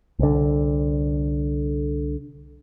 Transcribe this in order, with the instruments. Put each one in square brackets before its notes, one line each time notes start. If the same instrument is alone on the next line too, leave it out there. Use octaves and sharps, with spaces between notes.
[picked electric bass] C2 D3